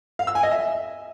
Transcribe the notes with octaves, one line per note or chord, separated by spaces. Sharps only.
F5
E6
G#5
D#5
E5